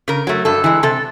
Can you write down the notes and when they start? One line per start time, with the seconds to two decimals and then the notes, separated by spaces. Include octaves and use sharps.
0.08 C#3 A#4
0.27 F#3 A3
0.45 G2 A4
0.64 E3 G#3
0.83 C3 A4